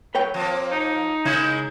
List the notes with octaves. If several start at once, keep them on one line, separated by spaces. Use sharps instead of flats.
F#3 B4 C#5 G5
F3 A#3 C4
D#4
C#3 G#3 A#3 D#4 E4